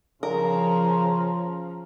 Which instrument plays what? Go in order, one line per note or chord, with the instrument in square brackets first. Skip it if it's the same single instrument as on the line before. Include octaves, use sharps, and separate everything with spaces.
[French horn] C#3 [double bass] F3 [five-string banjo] A#4 [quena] A#5